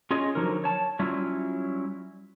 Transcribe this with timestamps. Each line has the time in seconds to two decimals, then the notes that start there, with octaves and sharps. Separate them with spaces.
0.11 C#4 F4 G#4 C#5 D#5
0.35 D3 F3 F#3 D#4 A#4
0.64 C#5 A5
0.99 F#3 G3 C#4 E4 F4